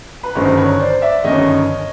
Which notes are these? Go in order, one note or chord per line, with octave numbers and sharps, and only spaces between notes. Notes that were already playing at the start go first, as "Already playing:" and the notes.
B4
G1 F#2 D#3 C5
B4 C#5
C5 D5
D5 E5
G1 F#2 D#3 C#5 D#5